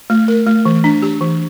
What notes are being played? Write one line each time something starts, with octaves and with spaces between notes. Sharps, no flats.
A3
A#4
A3
E3
D4
G4
E3